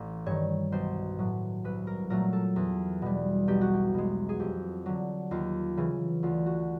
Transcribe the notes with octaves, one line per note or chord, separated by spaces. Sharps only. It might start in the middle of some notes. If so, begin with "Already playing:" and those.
Already playing: A1
G2 D#3 C#5
B1 C5
A2 F#3
C2 B4
A#4
A#2 F#3 A3 A#4
A4
E2
B2 G3
B1 G4
F#4
G4
B2 G#3
G#4
F2 G4
D3 F#3
D#2 F4
C#3 E3
D2 F4
F#4